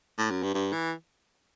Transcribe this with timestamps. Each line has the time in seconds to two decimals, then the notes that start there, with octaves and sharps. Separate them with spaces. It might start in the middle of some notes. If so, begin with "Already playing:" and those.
0.18 A2
0.30 F#2
0.43 G2
0.54 G2
0.73 E3